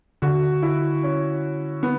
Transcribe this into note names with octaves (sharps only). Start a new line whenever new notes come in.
D3 F#4
E4
C#4
B3